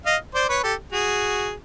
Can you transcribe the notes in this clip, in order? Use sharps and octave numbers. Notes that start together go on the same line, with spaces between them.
D#5 F5
C5 D5
B4 C#5
G4 A4
F#4 G#4